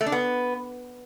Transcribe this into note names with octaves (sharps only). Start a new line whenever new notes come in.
A3
D4
B3